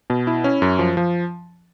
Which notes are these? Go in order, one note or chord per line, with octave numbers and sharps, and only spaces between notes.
B2
E4
C#4
F#2
F3
F3